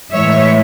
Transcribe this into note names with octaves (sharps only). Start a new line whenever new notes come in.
A2 E3 G#3 C#5 E5